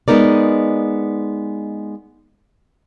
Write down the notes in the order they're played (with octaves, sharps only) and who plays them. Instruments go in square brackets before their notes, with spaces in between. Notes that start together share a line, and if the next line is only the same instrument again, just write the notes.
[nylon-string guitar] G#3 B3 D#4 A#4 D5